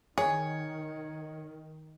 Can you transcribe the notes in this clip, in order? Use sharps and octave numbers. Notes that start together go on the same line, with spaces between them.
D#3 G#4 C#5